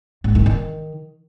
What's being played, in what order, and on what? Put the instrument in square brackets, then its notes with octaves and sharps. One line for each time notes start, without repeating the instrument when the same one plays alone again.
[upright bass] G#2
D#3
D#3